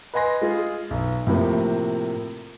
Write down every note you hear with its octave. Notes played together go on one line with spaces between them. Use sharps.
B4 D#5 G#5 C6 A#6
G#3 F4 G#4
B1
A2 C3 F3 A#3